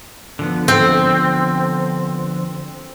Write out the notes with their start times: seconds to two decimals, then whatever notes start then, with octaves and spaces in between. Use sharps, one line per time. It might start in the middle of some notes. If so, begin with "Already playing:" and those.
0.39 D3 F3 B3
0.68 C4